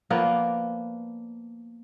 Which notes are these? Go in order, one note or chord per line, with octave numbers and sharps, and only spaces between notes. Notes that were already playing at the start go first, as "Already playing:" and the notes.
F3 A#3 B3 D5